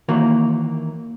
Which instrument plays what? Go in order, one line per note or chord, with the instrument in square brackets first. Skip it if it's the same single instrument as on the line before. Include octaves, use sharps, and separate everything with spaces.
[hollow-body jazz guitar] D#3 E3 A#3 F#4 A#4